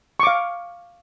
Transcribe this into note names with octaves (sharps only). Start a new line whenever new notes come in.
F5 C#6 D6